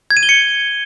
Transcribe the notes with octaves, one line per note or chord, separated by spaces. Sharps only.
G#6
D#7
G7
C#7